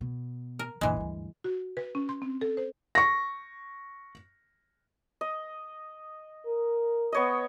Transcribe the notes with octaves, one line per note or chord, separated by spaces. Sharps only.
B2
A#4
A#1 F#2 E3 G#3
D2 G2
F#4
B4
C#4
C6
C4
A4
C5
C#6 A#6
D#5
A#4
B3 C#5 D#5